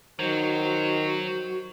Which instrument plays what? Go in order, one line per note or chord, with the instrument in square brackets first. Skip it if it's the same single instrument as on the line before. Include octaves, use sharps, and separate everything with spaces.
[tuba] D#3 [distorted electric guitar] F#3 [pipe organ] F#4 [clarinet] C5